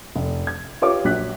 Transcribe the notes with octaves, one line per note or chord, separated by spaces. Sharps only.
F1
G#6
F4 G4 B4 C#5 D6
A#1 F#3 F#6 B6